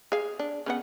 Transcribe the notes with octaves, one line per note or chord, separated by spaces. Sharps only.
G#4 F5
D4
C#3 B3 F#5